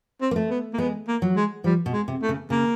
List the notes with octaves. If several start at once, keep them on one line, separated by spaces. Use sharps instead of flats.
C4
A#3
A3
B3
A#3
G#3 B3
A#3
F#3
G#3
F3 G3
B2
G#3
C3
A3
C#3
C#3 A#3